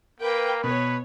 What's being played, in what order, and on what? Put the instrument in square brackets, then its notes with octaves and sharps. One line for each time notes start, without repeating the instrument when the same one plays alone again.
[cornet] A#3 [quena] A#4 [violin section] B4 G5
[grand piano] B2 [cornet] B4 [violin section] C#5